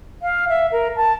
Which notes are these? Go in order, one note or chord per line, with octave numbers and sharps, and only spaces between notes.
F5
E5
A#4
A5